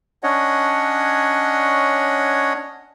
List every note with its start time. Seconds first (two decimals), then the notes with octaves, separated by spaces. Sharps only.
0.23 C#4 D4 C#5 D#5 F#5